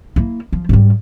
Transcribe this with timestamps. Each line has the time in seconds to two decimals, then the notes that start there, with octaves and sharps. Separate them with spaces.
0.16 A#3 E4
0.52 F3
0.69 G#2 G3